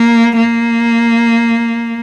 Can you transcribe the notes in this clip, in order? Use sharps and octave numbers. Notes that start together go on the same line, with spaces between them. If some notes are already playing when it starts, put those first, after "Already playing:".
Already playing: A#3
A#3